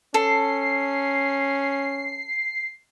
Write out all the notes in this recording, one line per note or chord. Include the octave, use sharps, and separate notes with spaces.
C#4 A4 C7